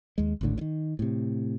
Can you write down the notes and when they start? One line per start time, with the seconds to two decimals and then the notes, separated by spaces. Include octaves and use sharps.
0.18 D#2 G#3
0.41 G#1 C#2 A2 D3
0.58 D3 D#3
0.99 A2 C3